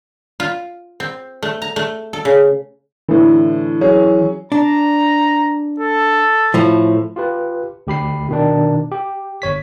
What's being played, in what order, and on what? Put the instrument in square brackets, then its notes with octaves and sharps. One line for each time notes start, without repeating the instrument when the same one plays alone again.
[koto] F4
C4
A3
A#5
A3
A4
C#3
[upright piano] A2 D3 [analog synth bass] E3
[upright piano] F#3 C#4 G#4
[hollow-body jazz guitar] D4 [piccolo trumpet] A#5
[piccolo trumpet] A4
[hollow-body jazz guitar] A2 F3
[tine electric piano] F4 G4 B4
D2 G4 B5 C7
B2 D#3 D4
G4
G1 C#5 B6